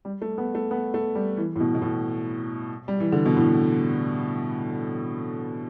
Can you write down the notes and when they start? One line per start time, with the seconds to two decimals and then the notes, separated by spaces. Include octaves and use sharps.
0.05 G3
0.22 A3
0.38 B3
0.55 A3
0.71 B3
0.94 A3
1.15 G3
1.37 E3
1.56 A2
1.60 B2
1.74 B2
1.82 A2
2.88 G3
3.00 E3
3.12 D3
3.25 B2
3.37 A2